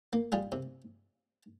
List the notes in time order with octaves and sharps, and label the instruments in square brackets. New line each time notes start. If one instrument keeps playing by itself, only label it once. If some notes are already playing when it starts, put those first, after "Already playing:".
[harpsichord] A#3
G3 F4 G#4
C3